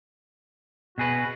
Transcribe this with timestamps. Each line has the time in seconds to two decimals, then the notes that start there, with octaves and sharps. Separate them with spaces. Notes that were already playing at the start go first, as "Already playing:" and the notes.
0.98 B2 F#4 G#4 B4